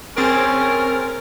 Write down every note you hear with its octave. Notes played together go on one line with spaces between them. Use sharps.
C4 C#4 G#4 A#4 A6